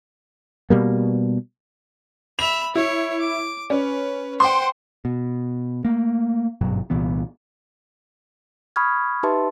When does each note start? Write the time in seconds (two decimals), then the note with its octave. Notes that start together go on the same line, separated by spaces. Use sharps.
0.70 B2 G3 A#3
2.39 E5 B5 F7
2.75 E4 C#5
3.20 D6
3.70 C#4 B4
4.40 C5 F#5 G5 C6
5.05 B2
5.85 A3 A#3
6.61 G#1 G2 B2 F#3
6.90 C2 A#2 E3 B3
8.76 B5 C#6 D#6 F6 G#6
9.23 D#4 G4 B4 E5 A5 C6